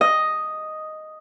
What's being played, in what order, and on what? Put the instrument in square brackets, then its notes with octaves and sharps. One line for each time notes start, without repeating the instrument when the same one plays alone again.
[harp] D#5